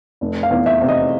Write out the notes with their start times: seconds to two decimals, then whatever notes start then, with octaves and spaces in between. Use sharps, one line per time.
0.21 F1
0.43 F5
0.50 E2
0.66 E5
0.81 C3
0.89 D#5